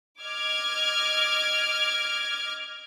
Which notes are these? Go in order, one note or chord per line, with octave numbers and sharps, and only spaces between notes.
D#5 D6 F6 G#6